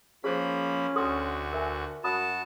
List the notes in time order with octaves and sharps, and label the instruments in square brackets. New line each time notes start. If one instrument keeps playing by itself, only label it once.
[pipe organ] F3 A#3 B5 [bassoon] C#4 [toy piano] G#4 C5
[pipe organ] D2 F#4 [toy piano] A4 C6 D#6
[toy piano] A#4 E5 G#5
[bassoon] F#2 [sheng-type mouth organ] F#4 A5 [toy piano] B5 D#6